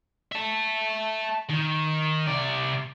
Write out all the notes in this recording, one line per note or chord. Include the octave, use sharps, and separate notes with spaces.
E5 A5
D#3
C3 D5